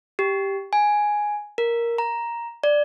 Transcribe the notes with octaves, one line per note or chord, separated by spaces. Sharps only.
G4
G#5
A#4
A#5
D5